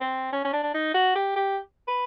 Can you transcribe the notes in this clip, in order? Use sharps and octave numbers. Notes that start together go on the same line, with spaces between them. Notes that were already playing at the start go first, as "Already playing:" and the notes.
C4
C#4
C#4
D4
D4
D#4
F#4
G4
G4
B4